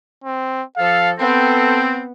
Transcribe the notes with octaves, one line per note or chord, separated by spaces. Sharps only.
C4
F3 A4 F5
B3 C4 A4